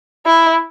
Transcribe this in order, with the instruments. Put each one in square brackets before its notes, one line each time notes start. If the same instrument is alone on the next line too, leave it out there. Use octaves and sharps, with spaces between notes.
[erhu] E4